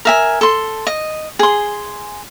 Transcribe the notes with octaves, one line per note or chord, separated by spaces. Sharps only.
A#4 E5 G#5
A4 C6
D#5
G#4 C6